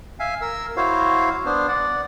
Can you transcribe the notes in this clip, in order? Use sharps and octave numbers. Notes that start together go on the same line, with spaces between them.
E5 F5 G#5
A#4 E6
E4 F#4 C5 C#5 F5
B3 D4 C5
D5 F#5